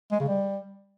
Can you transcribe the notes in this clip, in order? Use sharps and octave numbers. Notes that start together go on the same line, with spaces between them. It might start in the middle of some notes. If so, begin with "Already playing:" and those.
G#3
C#3
G3